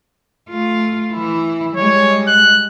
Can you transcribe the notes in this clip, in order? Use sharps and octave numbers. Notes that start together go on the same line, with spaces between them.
A3 F4
E3 E4
G3 G#3 C#5
F#6